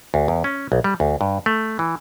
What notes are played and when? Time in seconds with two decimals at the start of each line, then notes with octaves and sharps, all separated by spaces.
0.14 D2
0.28 E2
0.44 C#4
0.72 B1
0.84 G3
1.00 D2
1.21 G2
1.46 A3
1.79 E3